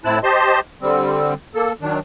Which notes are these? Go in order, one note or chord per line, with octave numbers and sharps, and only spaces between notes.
A2 C4 E4 A5 F#6
G4 C5 D#5 A5 C6
D3 G3 C4
A#3 A4
D#3 F#3 D4